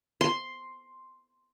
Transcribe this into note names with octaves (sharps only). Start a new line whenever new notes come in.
C6